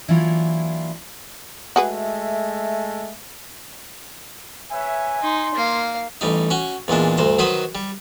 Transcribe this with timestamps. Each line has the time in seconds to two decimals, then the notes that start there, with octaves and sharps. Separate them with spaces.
0.08 E3 F#3 A#3 D4 E4 F4
1.76 G#3 A3 F#4 G#4 B4 E5
4.72 B4 C#5 E5 G#5
5.22 D#4 C6
5.55 A#3 F5
6.21 A1 G3 D#4
6.50 C#4 F#4
6.88 E2 A#2 G#3 D4
7.18 D2 G2 C5 A#5
7.39 D#3 F#3 F#4 B4 C5 D#5
7.75 G3